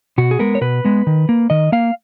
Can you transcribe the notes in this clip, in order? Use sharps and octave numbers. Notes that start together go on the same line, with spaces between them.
B2 F#4
G#4
G#3 B3 A#4
C#5
B2 B4
G#3 B3
D#3
A#3
D#3 D#5
A#3 F5